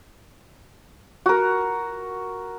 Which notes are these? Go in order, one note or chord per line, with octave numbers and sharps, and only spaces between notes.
F#4 A#4